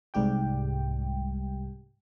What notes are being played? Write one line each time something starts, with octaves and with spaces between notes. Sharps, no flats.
C2 G#2 G3 G4 G5